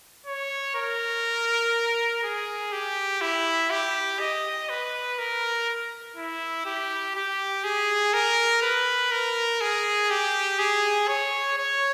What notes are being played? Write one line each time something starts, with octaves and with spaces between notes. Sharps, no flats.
C#5
A#4
G#4
G4
E4
G4
D#5
B4
A#4
E4
G4
G4
G#4
A#4
B4
A#4
G#4
G4
G#4
C#5
C#5